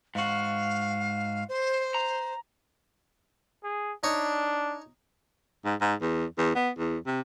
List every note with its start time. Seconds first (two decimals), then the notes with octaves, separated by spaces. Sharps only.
0.15 G#2 F#4 F5
1.49 C5
1.94 A#5
3.63 G#4
4.04 D4 D#4 C#5
5.65 G#2
5.81 G#2
6.01 E2
6.38 E2
6.55 B3
6.78 E2
7.07 C3